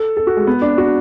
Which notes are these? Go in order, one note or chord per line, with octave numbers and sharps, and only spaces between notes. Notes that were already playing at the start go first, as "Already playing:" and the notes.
Already playing: A4
A4
F#4
G#3
B3
D4
F#4